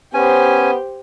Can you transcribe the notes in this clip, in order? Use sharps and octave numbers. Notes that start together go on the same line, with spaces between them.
B3 C#4 G4 C5 G#5